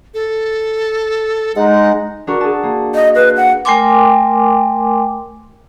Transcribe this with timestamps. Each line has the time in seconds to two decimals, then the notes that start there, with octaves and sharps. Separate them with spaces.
0.14 A4
1.56 G#3 D#4 F#5
2.27 D4 F#4 A#4
2.41 G#4 A5
2.63 A#3
2.95 D#5
3.15 F4 B4
3.37 F#5
3.65 A3 A#4 G5 G#5 C6 D6